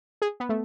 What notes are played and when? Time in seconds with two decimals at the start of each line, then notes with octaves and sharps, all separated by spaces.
0.22 G#4
0.40 B3
0.49 A3